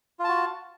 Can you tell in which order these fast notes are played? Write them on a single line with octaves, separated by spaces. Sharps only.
F4 A5 F#4